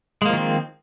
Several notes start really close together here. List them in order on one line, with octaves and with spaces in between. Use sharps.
G#3 A#3 F3 D#3 C4